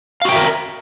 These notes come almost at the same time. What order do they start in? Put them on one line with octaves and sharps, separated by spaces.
F5 F#4 G5 E5 A#4